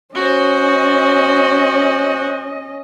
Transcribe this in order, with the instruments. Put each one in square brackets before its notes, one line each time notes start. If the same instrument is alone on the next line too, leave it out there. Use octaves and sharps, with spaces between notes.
[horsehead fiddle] C#4 D#5 [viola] F#4 C5